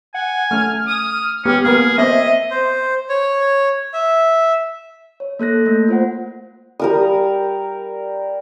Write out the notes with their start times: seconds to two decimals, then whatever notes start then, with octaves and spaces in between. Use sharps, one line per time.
0.14 F#5 G#5
0.51 A3 C#4 A4 F6
0.88 D#6
1.45 G#3 B3 C#4 G4
1.64 A#3 B3 G#4 A#4
1.98 B3 C4 C5 D#5 E5
2.51 C5
3.09 C#5
3.93 E5
5.20 C#5
5.39 A#3 A4 F#6 A#6
5.66 A3 A#3
5.88 F4 C5 F#5
6.79 G3 A#4 D#6